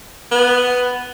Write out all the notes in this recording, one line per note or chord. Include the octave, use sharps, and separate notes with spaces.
B3